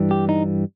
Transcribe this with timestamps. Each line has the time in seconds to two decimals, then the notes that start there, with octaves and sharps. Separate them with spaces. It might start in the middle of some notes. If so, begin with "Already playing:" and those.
Already playing: G2 E3 G3
0.11 G4
0.29 D#4